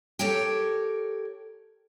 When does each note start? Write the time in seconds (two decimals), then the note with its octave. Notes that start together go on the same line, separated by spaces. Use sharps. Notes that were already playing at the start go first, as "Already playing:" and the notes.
0.19 G4 A4 A#4 C#5 G5